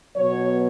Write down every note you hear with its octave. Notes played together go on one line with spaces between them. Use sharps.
B2 F#3 B3 C#5